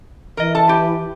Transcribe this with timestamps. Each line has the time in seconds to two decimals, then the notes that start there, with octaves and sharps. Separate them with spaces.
0.37 E3 A#4 D#5
0.55 A4 A5
0.67 G4 B4